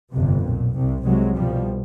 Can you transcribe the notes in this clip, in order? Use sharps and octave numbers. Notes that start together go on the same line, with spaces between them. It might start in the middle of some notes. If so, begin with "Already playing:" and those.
G1 F2 C3
B1 A#2
C2 C3
C2 C3 F#3 G#3
C2 B2 F3 G3